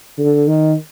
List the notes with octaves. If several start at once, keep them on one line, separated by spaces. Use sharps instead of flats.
D3
D#3